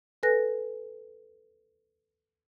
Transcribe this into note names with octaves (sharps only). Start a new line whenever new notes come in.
A4 B4 G#5 F#6 A#6